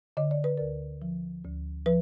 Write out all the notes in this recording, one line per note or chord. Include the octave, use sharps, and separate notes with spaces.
D3 D#5
D5
B4
D2 A#4 D5
F3
D2
F3 B4